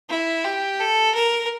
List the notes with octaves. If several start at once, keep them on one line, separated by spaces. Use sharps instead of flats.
E4
G4
A4
A#4